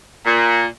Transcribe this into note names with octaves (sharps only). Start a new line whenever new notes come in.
A#2